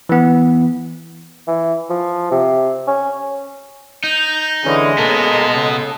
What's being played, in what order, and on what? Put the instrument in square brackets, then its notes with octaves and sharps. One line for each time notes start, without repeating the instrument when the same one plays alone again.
[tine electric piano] E3 B3
[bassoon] E3
F3
C3
C#4
[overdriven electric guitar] D#4 [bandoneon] G6
[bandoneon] D3 E3 C#4 [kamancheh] G#3 D#5
[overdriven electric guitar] B2 B3 [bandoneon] A#3 A4 A#4
[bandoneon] C#3 A4